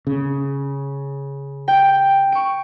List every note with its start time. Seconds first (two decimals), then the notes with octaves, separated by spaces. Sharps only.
0.07 C#3
1.68 G5
2.32 C#6 D7